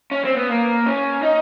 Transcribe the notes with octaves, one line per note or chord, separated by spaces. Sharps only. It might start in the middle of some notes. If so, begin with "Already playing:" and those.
C#4
C4
B3
A#3
C#4
D#4